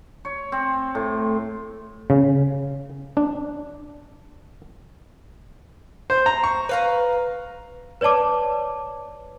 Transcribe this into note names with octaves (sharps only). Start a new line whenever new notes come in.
C#5
C4
A2
C#3
D4
C5
A#5
C#6
B4 F5 A#5
B4 C#5 D5 A5 D6